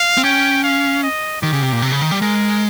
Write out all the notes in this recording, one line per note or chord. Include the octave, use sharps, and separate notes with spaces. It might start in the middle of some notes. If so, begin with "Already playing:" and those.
Already playing: F5
C4
C#4 G5
F5
D#5
D#3 G4
C#3
C3
A#2
C3
C#3
D#3
G3
G#3 A#4